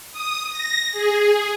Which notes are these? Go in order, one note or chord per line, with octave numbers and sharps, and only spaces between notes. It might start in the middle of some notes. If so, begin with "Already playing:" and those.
D#6
A#6
G#4